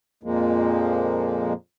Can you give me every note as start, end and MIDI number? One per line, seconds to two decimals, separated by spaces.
0.23 1.53 41
0.23 1.53 46
0.23 1.53 53
0.23 1.53 56
0.23 1.53 58